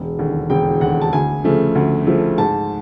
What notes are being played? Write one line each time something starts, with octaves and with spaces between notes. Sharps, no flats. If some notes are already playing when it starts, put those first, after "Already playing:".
Already playing: E1
D#2 D3
E1 G5
D#2 D3 F#5
A5
D2 G#5
C#3 F3 A3
D2
C#3 F3 A3
G#2 A5